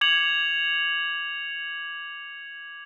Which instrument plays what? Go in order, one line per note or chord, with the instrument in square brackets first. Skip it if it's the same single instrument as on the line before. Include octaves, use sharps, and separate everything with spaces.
[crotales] D6 G#6 C#7 F7 F#7